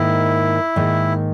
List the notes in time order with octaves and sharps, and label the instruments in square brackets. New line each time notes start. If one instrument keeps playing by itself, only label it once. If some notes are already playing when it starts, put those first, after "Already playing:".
Already playing: [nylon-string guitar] G#2 D#3 A#3 [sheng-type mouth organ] E4
[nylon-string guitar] G#2 D#3 A#3